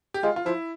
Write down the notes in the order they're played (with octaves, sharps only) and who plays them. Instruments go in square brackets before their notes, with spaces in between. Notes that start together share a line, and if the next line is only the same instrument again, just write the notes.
[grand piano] G4
[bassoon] G#3 [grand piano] F4
[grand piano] F4
[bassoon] F3 [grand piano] E4